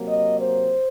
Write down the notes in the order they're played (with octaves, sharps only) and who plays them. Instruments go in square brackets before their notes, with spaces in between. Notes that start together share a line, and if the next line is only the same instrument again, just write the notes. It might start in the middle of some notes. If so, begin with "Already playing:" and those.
Already playing: [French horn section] C3 F#3 A#3
D#5
C5